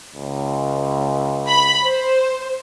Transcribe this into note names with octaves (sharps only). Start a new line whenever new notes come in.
C#2
B5
C5